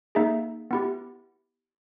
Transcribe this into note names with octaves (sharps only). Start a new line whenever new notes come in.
A#3 D#4 G#4 E5
B3 E4 G4